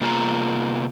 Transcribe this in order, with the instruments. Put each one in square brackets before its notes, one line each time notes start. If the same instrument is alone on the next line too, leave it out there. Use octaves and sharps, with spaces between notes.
[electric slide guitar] C3 A#3 F4 G#4 G#5 A#5